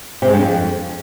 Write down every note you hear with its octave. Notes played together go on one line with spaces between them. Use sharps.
C3
G#3
G2
F2